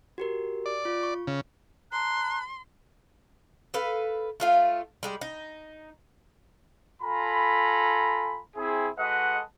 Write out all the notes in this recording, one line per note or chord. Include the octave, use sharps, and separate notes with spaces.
F#4 G4 A#4
D5
F4
C#6
C#3
A5 A#5 C6 F#6
A4 B4 F5
A3 F4 F5
G3 G#3 G4
D#4
F4 A4 G#5 A#5 B5
C4 E4 G#4
G#3 F#4 A4 B4 D#5 F#5